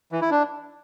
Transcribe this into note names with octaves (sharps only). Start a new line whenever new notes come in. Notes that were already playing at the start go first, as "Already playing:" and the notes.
E3
E4
D4